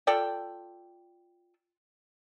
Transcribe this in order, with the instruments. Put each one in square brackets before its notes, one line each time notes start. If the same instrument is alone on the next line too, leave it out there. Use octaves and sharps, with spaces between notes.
[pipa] F4 A4 D5 G5